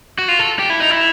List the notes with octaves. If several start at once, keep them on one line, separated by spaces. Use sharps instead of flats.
F#4
F4
A4
G4
E4
D#4
E4